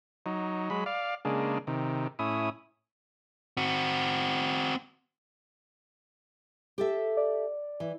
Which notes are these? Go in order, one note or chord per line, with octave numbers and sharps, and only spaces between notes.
F#3 D#4
F#3 G#3 B5
D5 F5
C#3 G#3 A#3 D4
C3 D#3
A2 C#4 E4 D#6
C4 F#4
G4 A4 E5
D5
E3